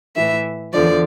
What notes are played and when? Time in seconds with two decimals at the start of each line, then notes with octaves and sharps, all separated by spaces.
0.16 A2 E3 E5
0.73 E2 D3 F3 D5